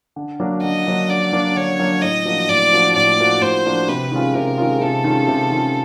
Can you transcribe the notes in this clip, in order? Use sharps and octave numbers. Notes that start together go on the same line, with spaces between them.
D3
F#3 A#3 D4
D3 D#5
F#3 A#3 D4
D3 D5
F#3 A#3 D4
D3 C#5
F#3 A#3 D4
A2 D#5
F3 A#3 D4 F#4
A2 D5
F3 A#3 D4 F#4
A2 D5
F3 A#3 D4 F#4
A2 C5
F3 A#3 D4 F#4
C3 B4
D#3 G#3 C#4 F4
C3 A#4
D#3 G#3 C#4 F4
C3 A4
D#3 G#3 C#4 F4
C3
D#3 G#3 C#4 F4